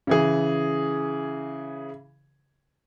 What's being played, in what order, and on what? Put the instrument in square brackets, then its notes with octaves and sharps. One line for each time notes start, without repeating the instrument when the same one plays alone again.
[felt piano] C#3 E3 G#4